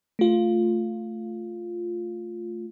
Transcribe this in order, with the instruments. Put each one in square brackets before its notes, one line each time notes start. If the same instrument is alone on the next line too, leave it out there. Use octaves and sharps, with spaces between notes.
[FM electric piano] A3 F4